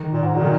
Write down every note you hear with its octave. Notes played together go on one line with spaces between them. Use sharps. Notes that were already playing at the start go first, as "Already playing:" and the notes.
Already playing: D#3
A#2
G#2
A#2 F#3
D#3